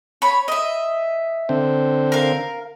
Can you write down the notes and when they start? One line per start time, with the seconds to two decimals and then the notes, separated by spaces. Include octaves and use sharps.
0.22 C#5 B5
0.48 D#5 E5
1.49 D3 C4
2.12 A#4 F5